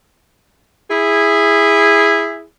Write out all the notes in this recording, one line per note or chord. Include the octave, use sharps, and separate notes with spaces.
E4 G#4